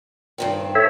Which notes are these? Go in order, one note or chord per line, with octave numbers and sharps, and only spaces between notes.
G2 D#3 C4
A4 C#5 E5